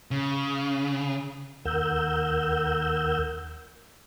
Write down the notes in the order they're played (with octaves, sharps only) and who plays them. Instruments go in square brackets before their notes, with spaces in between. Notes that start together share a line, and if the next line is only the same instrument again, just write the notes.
[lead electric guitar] C#3
[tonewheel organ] D#2 A#4 F#5 E6 G6